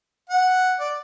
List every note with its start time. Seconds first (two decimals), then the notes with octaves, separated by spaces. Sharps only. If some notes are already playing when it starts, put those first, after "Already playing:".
0.29 F#5
0.80 D5